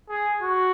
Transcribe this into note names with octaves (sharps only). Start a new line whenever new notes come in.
G#4
F#4